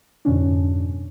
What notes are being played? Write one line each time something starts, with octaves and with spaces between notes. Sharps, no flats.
F2 G#2 B2 D3 C#4 D4